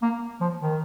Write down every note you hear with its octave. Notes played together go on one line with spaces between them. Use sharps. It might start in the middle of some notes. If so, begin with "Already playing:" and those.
A#3
F3
D#3